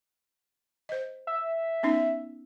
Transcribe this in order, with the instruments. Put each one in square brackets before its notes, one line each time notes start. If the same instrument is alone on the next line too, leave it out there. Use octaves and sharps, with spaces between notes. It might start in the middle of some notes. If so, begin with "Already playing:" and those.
[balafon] C5 D#5
[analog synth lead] E5
[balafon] B3 C#4 D#4